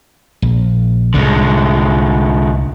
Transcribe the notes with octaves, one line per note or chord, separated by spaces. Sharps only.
A#1
C2 A2 D3 D#3 G#3